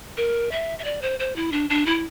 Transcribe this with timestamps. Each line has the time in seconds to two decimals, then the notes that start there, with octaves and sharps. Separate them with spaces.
0.17 A#4
0.52 E5
0.79 E5
0.84 D5
1.02 C5
1.19 C5
1.36 E4
1.52 D4
1.70 D4
1.86 E4